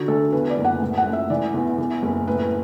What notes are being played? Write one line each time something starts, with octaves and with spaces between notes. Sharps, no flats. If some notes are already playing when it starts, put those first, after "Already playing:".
Already playing: D3 F#4
D2 A4
E2 B4
D5
F#1
F#5
A2
F#5
A1
E5
E3 D5
E2
E2
F#1
A2 B4